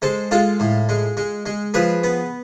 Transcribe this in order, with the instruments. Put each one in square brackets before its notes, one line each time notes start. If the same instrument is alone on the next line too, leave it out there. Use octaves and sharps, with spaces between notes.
[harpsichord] G#3 A4 C5
G#3 F4 A4
A2
G#3
G#3
G#3
F3 G#4 B4
B3